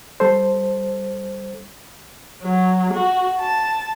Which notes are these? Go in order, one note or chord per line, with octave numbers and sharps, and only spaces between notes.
G3 A4 C5
F#3
F#4
A5